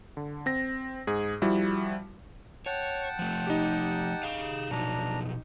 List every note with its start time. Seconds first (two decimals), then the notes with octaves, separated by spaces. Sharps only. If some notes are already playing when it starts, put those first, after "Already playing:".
0.17 D3
0.46 C4 A#6
1.07 G#2 G#4
1.42 F3 G3 E4 F#4
2.66 C#5 F#5 G5 A5
3.19 F3 A3
3.47 D#4 G4
4.23 G#4 F5
4.71 B2 F3 F#3 D4 A#5